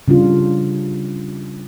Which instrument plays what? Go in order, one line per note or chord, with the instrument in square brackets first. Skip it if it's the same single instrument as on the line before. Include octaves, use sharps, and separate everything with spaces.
[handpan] C#3 G3 D4 F4